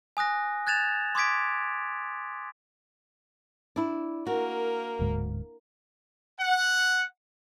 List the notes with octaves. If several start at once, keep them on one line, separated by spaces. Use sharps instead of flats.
G#5 D#6 F#6 A#6
F#6 G#6 A6 E7 F7
C6 D6 D#6 G#6 B6 D7
D4 E4
A#3 F#4 A#4
D1 D2 G#2
F#5